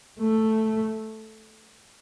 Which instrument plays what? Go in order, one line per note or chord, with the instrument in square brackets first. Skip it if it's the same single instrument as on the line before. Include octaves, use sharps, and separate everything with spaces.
[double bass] A3